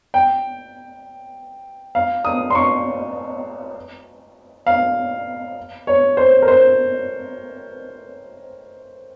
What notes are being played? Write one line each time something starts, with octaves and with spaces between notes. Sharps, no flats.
G5
F5
D#6
C6
C#6
F5
C#5
C5
A#4
C5